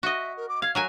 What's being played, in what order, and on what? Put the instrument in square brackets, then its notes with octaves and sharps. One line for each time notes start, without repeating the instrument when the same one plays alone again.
[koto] F#4 D#5 [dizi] E5
[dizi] A#4
D6
[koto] F5 [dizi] G#6
[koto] F#3 A#4 G#5 [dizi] F#6